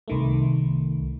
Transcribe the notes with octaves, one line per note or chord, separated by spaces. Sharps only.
C2 D#3 A3